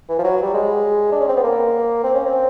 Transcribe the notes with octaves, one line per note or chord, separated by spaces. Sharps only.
E3
F3
F#3
G3
G#3
D4
C#4
C4
B3
A#3
C4
C#4
C4